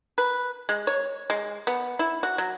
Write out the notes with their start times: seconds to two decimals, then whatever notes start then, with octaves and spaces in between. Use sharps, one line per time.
0.18 B4
0.69 G#3
0.87 C#5
1.30 G#3
1.67 B3
1.99 E4
2.23 F#4
2.38 F#3